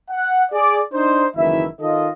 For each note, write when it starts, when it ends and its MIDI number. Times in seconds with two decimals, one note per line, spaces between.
0.11 0.42 78
0.52 0.80 68
0.52 0.80 74
0.93 1.25 62
0.93 1.25 63
0.93 1.25 72
1.36 1.65 30
1.36 1.65 51
1.36 1.65 52
1.36 1.65 64
1.36 1.65 76
1.80 2.08 51
1.80 2.08 65
1.80 2.08 69
1.80 2.08 75